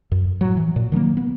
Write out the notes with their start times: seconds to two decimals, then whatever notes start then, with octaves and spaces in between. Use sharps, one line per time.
0.12 F#2
0.41 A2 F#3
0.57 E3
0.76 A#2
0.92 D#3 F#3 G#3 A#3
1.17 B3